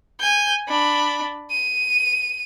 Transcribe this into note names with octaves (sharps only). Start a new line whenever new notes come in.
G#5 G6
D4 B5
D#7